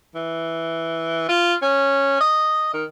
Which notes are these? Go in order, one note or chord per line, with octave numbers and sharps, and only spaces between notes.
E3
F4
C#4
D#5
D#3